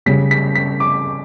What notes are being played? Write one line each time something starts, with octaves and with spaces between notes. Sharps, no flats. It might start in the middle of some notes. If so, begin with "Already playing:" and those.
C#3 G3 C#4 B6
B6
B6
D6